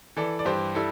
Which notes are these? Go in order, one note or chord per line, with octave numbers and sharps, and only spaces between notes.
E3 A4 D5
D5
G2 G4 C5
G3 E4 A4